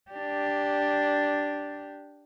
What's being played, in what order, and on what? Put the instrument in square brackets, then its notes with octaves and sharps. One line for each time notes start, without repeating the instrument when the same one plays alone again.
[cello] D4 G4